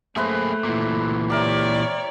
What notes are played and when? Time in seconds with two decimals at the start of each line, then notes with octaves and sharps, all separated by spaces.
0.16 A3 A#3 G#4 B4 C5 E5
0.64 A#2 E3
1.30 G4 A#4 C#5 D5 E5